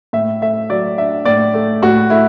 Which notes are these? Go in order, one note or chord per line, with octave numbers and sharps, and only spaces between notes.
A2 E5
A3 E5
F#3 D5
D4 E5
A2 D5
A3
A2 F#4
A3 E4